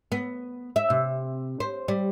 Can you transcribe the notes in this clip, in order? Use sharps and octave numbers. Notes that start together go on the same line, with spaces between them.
B3
E5
C3
C5
G3